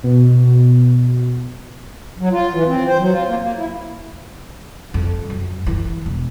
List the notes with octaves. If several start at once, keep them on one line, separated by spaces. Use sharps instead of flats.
B2
F#3
F4
E3
C4
C5
F#3
F4
A#3
A#3
E4
F2
F#2
E3
E1